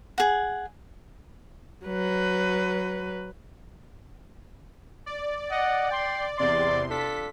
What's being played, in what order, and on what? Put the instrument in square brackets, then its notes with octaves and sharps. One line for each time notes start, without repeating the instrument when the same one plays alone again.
[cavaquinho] G#4 F#5
[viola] F#3 B4
[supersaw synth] D5
[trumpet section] D#5 F#5
G5 C6
[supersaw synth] E2 C3 C6 [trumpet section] D5
[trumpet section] D4 F4 A4 [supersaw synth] B6